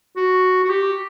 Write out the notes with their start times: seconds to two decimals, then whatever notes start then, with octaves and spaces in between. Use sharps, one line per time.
0.17 F#4
0.65 F#4
0.70 G4